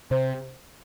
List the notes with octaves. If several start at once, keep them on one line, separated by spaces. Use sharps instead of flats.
C3 C5